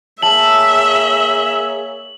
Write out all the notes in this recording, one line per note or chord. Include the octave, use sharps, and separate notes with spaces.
A#3 G#4 C#5 E5 A5 F#7